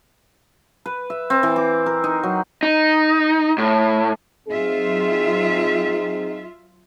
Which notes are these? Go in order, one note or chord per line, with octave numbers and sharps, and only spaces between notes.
B4
E5
C4
E3
D6
A#4
D#4
F#3
D#4
A2
F#3 C4 D#4 F4 G#4 E5